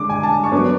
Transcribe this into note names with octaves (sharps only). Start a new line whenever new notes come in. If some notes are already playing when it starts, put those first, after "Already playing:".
Already playing: D3 G#3 D4 D6
G#5
A5
C#6
F#3 B3 D4 D6